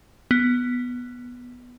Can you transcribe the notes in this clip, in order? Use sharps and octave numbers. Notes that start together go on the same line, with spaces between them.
B3